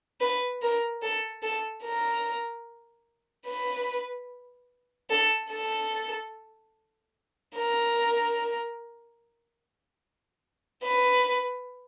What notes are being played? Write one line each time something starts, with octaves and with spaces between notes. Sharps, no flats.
B4
A#4
A4
A4
A#4
B4
A4
A4
A#4
B4